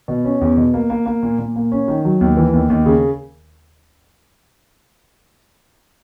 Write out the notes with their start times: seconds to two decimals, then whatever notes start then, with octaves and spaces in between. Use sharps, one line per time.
0.08 B2
0.25 C#4
0.41 E2
0.57 B2
0.74 A#3
0.90 A#3
1.06 A#3
1.23 A#2
1.38 A#2
1.56 A#3
1.72 C#4
1.88 D#3
2.05 F#3
2.21 D#2
2.37 E3
2.53 D#2
2.70 D#2
2.86 C#3